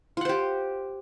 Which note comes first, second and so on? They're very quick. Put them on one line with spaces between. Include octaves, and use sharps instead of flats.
F4 F#5 C5 G4